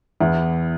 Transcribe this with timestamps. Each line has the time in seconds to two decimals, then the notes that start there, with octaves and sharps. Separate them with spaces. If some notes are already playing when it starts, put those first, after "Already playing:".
0.20 E2 E4